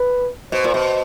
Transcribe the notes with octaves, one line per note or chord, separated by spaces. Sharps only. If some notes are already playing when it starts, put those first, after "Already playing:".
Already playing: B4
B2 C5
A#2
B2